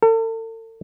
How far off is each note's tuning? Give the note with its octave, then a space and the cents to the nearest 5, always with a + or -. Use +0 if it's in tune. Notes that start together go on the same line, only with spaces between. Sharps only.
A4 +40